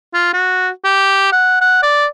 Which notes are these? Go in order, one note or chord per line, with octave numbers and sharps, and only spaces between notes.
F4
F#4
G4
F#5
F#5
D5